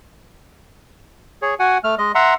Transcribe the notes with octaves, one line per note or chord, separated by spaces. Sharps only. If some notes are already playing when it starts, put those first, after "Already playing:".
G#4 C#5
F#4 F#5 G#5
A3 F6
G#3 D#5
E5 F#5 A#5 C6